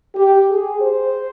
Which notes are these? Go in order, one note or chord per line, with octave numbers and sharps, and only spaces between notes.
G4
G#4
C5